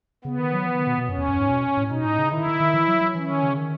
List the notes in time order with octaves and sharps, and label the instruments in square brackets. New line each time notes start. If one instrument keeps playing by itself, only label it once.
[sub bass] C#3 [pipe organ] B3
[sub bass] D#3
F#3
E3
D#3
B2
B2
[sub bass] F#2 [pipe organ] C#4
[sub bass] E2
F#2
G#2
B2
A2
[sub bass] B2 [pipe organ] D#4
[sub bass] A2
C#3
[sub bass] D#3 [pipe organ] E4
[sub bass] D#3
D#3
E3
F#3
F#3
[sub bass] E3 [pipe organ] C#4
[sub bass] D#3
C#3
D#3